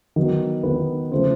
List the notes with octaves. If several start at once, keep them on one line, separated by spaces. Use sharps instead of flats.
D#3 F#3 B3
D#3 F#3 B3 B4
C#3 F3 A3 C5